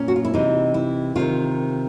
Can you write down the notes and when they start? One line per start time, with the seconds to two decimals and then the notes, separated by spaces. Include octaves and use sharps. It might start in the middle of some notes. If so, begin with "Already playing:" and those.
Already playing: A#2 C#4
0.08 F#4
0.16 F4
0.25 E4
0.34 C3 E3 D#4
0.74 E4
1.16 C3 D#3 F4